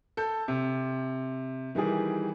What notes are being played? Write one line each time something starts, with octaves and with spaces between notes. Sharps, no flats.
A4 G6
C3
D#3 E3 G3 G#4